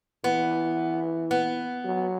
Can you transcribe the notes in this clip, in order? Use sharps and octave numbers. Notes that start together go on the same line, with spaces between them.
E3 B3
B3
F#3